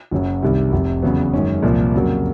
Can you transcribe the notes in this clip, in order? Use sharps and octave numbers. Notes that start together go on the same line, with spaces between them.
F#1 F#2 C#3 F#3
C2 C3 D#3 G3
F1 F2 C3
E2 C#3 F#3 B3
F#2 D#3 G#3 C#4
C2 A#2 F3 A#3
F2 C#3 F#3 A#3